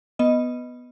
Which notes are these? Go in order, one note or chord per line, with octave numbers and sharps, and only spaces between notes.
B3 D#5